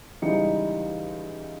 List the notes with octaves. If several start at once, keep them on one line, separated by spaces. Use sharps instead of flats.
C#2 E3 G3 D#4 C#7